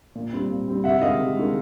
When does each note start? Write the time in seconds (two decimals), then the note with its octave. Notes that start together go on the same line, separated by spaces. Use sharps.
0.15 A#2
0.33 G3 C4
0.50 A#2
0.68 G3 C4
0.84 C3 E5 F#5
1.01 D#3 G#3 D#5 F5
1.20 C3
1.37 D#3 G#3